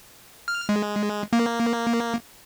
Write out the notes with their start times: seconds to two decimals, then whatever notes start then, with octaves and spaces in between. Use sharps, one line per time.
0.48 F6
0.69 G#3
1.33 A#3